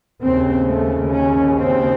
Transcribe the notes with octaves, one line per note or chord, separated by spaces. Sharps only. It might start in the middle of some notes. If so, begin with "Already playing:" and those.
D#2 C#3 C4
A3
C#4
C4